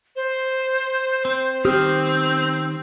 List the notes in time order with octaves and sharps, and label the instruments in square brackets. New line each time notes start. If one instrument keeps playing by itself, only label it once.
[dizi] C5
[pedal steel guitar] C4
[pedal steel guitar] D#3 D#6 F6 [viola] C4 [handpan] G4